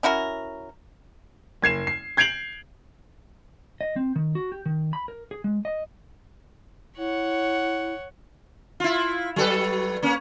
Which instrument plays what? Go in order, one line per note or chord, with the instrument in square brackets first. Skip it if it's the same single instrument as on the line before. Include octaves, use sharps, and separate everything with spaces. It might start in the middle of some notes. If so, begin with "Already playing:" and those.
[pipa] C#4 E4 F#4 A#4
[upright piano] F#1 G#6 C7 E7
C7
G6 G#6 C7 D7 F7 F#7
[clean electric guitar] D#5
C4
D#3
F#4
G4
D#3
B5
A#4
G#4
G#3
D#5
[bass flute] E4 [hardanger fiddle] C#5 F#5
[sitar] E4 F4
F#3 A4 B4
A#3 C#4